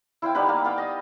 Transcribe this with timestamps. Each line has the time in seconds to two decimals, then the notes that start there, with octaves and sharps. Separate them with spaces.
0.22 E4 C5 F5 G5
0.35 G3 B3 D#4 B4
0.46 A#3 A5
0.64 B3 F5 G5
0.78 D#5